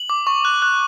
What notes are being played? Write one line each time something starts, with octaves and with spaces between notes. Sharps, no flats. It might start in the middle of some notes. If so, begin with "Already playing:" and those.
Already playing: F#7
D6
C#6
F#6
F#6